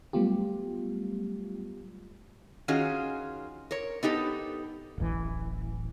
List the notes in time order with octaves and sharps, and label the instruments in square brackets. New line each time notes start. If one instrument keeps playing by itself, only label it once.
[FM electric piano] F#3 G3 A3 B3 F4 G4
[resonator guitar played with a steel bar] D#3 C#4 F4 F#4 G#4
A#4 C#5
B3 D#4 G4 A4
[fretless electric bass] D1 A1 E3